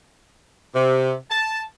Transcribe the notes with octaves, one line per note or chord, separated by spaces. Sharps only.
C3
A5